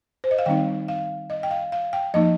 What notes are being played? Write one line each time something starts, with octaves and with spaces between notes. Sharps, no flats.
C5
D#5
F5
D#3 G3 C4 D#4 G5
F5
D#5
G5
F5
F5
G5
F3 A#3 D#4 D#5